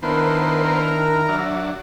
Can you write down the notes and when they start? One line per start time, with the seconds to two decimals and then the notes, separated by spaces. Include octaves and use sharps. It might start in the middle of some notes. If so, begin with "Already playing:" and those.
0.03 D#3 B3 D4 E4 A#4 C5
0.63 A#4 A#5
1.29 F#3 D4 E5